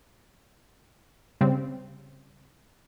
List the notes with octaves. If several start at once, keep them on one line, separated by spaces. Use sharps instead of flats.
C#3 G3 C4